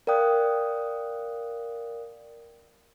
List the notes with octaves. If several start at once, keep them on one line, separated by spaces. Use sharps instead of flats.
A#4 D5 F5 G5 D#6 F#6